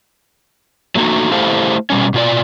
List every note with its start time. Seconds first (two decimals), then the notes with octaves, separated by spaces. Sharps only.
0.95 F#3 A3 A#3 C#4 D#4 F#4
1.32 A3 E4 G4 A4 C5 F5
1.90 B2 G3 C#4
2.14 B2 F4 D5